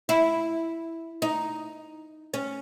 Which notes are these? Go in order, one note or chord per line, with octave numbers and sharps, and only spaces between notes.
E4
D#4
C#4